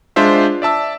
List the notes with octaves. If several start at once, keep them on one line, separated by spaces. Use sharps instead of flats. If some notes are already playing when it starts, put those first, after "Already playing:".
G#3 D4 F4 C5 E5
D5 E5 A5 E6